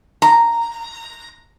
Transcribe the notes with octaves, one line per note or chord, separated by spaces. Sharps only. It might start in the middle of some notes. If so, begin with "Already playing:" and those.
A#5